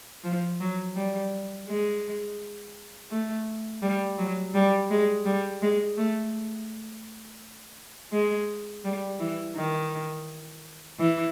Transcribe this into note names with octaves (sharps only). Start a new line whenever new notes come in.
F3
F#3
G3
G#3
A3
G3
F#3
G3
G#3
G3
G#3
A3
G#3
G3
E3
D#3
E3